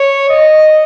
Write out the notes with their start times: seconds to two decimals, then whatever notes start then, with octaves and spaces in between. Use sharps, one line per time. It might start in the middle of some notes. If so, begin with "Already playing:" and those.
Already playing: C#5
0.29 D#5